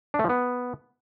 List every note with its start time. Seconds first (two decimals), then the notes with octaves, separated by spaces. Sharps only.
0.14 D4
0.19 A3
0.24 F3
0.29 B3